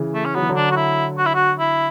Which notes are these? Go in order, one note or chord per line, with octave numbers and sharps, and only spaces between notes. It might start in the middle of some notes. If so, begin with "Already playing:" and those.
Already playing: C#3 E3
A3
C#4
F#3 B3
E3
D3 F#3
D4
F#4
E4
F#4
E4
F#4
E4